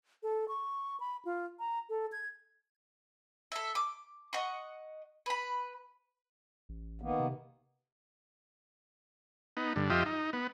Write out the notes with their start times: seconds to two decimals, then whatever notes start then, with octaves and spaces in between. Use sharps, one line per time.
0.23 A4
0.48 C#6
1.00 B5
1.25 F4
1.59 A#5
1.90 A4
2.12 G#6
3.52 A4 E5
3.75 D6
4.33 D#5 F#5 C#6
5.26 B4 B5
6.69 A1
7.01 D#3 A#3 B3
7.19 C3
9.57 B3 D#4
9.76 G2 D3
9.90 F2 F4 G4 D#5 E5
10.06 D#4
10.33 B3